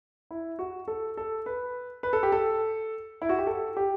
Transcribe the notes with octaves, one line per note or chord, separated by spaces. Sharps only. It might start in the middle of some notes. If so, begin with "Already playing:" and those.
E4
F#4
A4
A4
B4
B4
A4
G4
A4
E4
F#4
G4
A4
G4